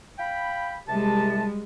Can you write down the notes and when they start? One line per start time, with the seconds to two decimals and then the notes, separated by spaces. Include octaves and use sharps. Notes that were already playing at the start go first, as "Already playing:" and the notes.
0.19 F5 G5 B5
0.88 C2 C3 G3 G#3 A5